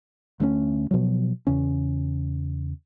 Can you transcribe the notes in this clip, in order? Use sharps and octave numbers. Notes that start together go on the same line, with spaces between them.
D2 A3 A#3 C#4
B2 F3 F#3
E2 C#3 C#4